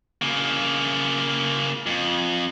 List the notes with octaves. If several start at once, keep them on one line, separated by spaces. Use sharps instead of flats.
C#3 A#3
F2